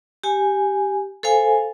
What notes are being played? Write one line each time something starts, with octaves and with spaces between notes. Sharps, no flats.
G4 G#5
A4 C5 F5 G#5